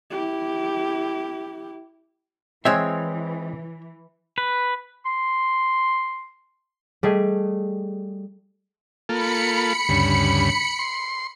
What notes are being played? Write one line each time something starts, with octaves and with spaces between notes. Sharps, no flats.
E4 G4
E3 G#3 C4 C#5 E5
B4
C6
G3 A3 G#4 D#5
A#3 F4 A4 B5 C#7
D2 G2 C#3
C6